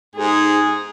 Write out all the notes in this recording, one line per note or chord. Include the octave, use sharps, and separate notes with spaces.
G#2 G#4